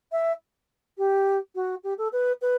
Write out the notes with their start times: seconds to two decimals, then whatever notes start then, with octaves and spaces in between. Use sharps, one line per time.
0.12 E5
0.98 G4
1.55 F#4
1.83 G4
1.98 A4
2.12 B4
2.41 B4